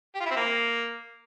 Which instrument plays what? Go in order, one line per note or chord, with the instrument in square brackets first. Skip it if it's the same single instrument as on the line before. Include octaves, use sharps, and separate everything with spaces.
[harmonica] G4
F4
E4
C4
A#3